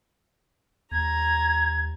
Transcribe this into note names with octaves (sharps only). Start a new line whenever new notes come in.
D#2 A#5 G#6